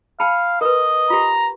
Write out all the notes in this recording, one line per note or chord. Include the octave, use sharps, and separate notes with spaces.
F5 G5 A5 B5
A#4 B4 D#5
F4 G4 A#5